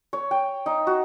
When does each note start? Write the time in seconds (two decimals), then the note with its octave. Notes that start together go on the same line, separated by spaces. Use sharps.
0.13 C#5
0.31 G5
0.66 D#4
0.87 F#4